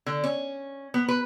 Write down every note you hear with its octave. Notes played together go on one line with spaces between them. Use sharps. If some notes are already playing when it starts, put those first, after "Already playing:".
D3
C#4
B3
B4